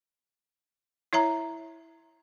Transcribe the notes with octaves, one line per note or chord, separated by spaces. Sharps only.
E4 C#5 E5 A#5